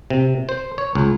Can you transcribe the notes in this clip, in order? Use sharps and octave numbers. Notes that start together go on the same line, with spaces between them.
C3
C5
C#5
C#2